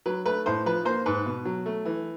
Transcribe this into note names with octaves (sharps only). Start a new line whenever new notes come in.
F#3 B4
A3 B4
A2 C5
F3 B4
A#3 C5
G#2 B4
B2
F#3
A3
E3